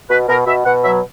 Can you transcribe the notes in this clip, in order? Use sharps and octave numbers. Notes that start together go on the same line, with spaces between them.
B2 B4
B2 A#4
B2 E5
B2 F#5
F#3 E5